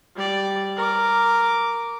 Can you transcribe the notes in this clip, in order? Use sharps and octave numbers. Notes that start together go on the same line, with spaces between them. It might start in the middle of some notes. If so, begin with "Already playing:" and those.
G3 D5
A#4 D6